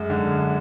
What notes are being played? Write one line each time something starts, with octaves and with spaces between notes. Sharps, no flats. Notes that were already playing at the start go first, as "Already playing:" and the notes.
Already playing: F#2 G#3
D3